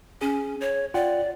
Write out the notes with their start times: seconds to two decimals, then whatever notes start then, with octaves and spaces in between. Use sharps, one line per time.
0.21 C#4 G#4
0.61 C#5
0.94 F4 D5 F#5 G5